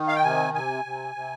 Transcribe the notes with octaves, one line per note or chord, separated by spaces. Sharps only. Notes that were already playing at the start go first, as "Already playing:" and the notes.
Already playing: D#3
F5
G5
C3 G#5
C3 G#5
C3
C3